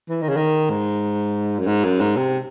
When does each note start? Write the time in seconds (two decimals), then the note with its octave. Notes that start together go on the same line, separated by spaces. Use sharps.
0.09 E3
0.22 D#3
0.29 C#3
0.36 D#3
0.69 G#2
1.59 F#2
1.67 G#2
1.84 F#2
2.00 G#2
2.16 C3